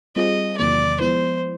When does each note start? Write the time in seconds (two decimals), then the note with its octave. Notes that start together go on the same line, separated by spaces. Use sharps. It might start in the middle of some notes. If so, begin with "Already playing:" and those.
0.16 G3 C4 F4 G#4 C5 D#5
0.58 E2 C3 D#3 F#3 A#3 D5
1.00 F3 G#3 B3 E4 C5